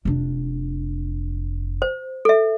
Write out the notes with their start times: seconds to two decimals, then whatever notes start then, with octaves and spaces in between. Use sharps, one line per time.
0.05 F1 D4
1.82 C5
2.25 A4 E5